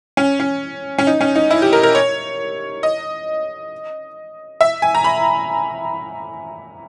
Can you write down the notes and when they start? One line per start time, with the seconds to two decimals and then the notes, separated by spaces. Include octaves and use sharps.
0.17 C#4
0.40 C#4
0.98 C#4
1.07 D#4
1.21 C#4
1.36 D#4
1.51 E4
1.62 G4
1.73 A#4
1.83 A#4
1.95 C#5
2.83 D#5
4.61 E5
4.82 G#5
4.95 A#5
5.04 B5